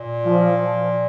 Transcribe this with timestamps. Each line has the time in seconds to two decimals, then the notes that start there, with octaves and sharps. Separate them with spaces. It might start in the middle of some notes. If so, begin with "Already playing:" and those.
Already playing: A#2
0.25 F3